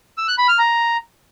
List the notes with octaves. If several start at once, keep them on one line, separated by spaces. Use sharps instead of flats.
E6
F#6
B5
F6
A#5